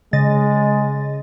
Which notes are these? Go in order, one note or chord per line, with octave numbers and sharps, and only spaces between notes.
C#3 G#3 D#5 A6